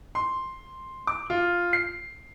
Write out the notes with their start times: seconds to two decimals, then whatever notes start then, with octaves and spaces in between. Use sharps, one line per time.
0.15 C6
1.07 D6
1.30 F4
1.73 C7